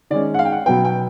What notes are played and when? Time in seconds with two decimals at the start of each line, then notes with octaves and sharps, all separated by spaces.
0.10 D#3 G#3 C#4 D5
0.34 F#5
0.39 F5
0.45 G5
0.52 F#5
0.66 B2 F#3 B3 G5
0.85 G5